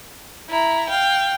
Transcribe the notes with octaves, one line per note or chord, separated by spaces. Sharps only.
E4 A#5
F5 G5